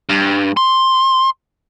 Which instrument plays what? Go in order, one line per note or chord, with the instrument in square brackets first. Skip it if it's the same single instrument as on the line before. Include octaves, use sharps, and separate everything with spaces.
[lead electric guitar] G2
C6